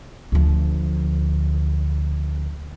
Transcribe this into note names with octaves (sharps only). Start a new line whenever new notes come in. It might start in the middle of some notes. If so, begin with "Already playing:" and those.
D2 F3